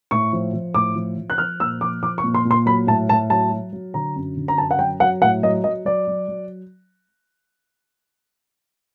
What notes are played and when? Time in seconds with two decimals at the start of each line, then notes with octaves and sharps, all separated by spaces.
0.11 A2 C#6
0.33 F3
0.53 F3
0.74 A2 D6
0.96 F3
1.18 F3
1.30 F#6
1.38 F3 F6
1.60 A#2 E6
1.81 F3 D6
2.03 F3 D6
2.18 C#6
2.24 A#2
2.35 C6
2.45 A#2
2.51 C6
2.66 F#3 B5
2.87 A2 A5
3.09 A2 A5
3.30 F#3 A5
3.51 F#3
3.73 F#3
3.94 D3 A#5
4.16 F#2
4.37 D3
4.48 A#5
4.58 F#2 A5
4.71 F#5
4.79 F#3 G5
5.00 F#3 F#5
5.22 A2 F#5
5.43 F#3 D#5
5.64 F#3 D#5
5.85 F#3 D5
6.07 F#3
6.28 F#3